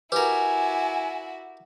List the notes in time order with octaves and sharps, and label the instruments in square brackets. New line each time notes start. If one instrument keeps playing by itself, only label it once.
[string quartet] E4 F#4 [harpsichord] G4 A#4 [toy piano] B4 [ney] G#5